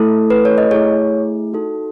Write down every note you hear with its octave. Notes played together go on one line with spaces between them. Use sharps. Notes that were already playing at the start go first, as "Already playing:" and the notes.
Already playing: A3 E4 A4
B4
C#5
D#5
A3 E4 G#4 C#5
D#4 F#4 A4